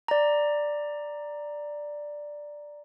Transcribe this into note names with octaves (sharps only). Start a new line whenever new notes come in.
D5 A#5